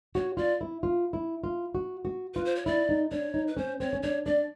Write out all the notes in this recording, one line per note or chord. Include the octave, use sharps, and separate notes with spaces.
F#4 C#5
F4 D5
E4
F4
E4
F4
F#4
F#4
F4 B4
C5
C#5
E4 D5
D#4
D4 C#5
D#4
B4
C#4 C5
C4 C#5
C#4
D4 C#5
D4 D5